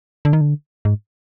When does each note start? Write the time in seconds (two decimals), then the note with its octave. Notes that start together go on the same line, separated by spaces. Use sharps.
0.25 D3
0.33 D#3
0.41 D3
0.85 G#2